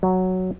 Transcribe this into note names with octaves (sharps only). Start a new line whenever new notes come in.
F#3